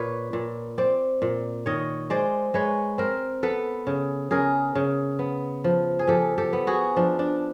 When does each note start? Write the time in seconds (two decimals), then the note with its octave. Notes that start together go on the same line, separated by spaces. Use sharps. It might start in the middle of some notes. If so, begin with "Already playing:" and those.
Already playing: A#2 B4 C#5
0.33 A#2
0.78 C4 C5 D5
1.22 A#2
1.66 D#3 C#5 D#5
2.10 G#3 C5 D5
2.54 G#3 B4 C#5
2.98 C4 A#4 C5
3.43 B3 A4 B4
3.87 C#3
4.31 C#3 G#4 A#4
4.75 C#3
5.19 B3
5.64 F3
5.99 G#4
6.07 F3 G4 A4
6.38 G4 A4
6.53 B3
6.67 F#4 G#4
6.96 F3 D4
7.19 D4